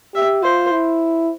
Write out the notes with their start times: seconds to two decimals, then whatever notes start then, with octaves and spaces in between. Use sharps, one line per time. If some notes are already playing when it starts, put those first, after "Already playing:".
0.14 G4 E5
0.43 F4 C5
0.72 E4